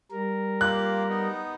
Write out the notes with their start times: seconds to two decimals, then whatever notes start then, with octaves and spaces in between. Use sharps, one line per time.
0.11 G3 A#4
0.61 A#3 F4 G4 F#6
1.09 B3 D#4